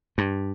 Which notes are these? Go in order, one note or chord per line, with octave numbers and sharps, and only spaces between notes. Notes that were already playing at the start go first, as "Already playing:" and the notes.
G2